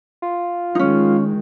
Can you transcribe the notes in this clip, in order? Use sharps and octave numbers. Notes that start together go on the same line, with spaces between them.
F4
D#3 G#3 C#4 D#4